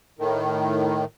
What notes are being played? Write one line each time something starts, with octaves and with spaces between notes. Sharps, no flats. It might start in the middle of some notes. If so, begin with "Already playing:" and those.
A2 D#3